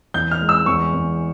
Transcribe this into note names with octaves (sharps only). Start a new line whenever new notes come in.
E2 G6
F6
G#3
E6
E2 C#6
E2